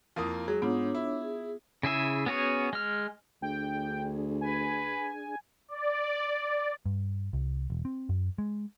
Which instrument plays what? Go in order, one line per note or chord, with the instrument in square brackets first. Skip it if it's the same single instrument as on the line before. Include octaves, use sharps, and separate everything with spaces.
[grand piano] F2 A#3 D#6 [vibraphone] E4
[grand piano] F#3 [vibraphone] G#3 [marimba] G#4
[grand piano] G#2 [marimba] B3 F4 [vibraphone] D4 C#5 D6
[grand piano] E4
[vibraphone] G#4
[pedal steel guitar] C#3 E4 G#4 E5
B3 C#4 F#4 G#4 C#5
G#3 F6
[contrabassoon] D2 [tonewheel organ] D4 G#4 [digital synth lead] G5
[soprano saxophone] B4 [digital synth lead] G#5
[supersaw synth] D5
[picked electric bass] G2
C2
E1
C4
F#2
G#3